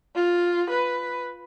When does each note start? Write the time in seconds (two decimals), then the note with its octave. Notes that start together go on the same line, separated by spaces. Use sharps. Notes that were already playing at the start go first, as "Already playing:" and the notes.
0.16 F4
0.71 B4